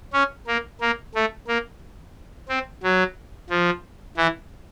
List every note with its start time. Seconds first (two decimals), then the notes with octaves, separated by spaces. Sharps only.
0.13 C#4
0.47 A#3
0.81 A#3
1.15 A3
1.47 A#3
2.49 C4
2.83 F#3
3.50 F3
4.17 E3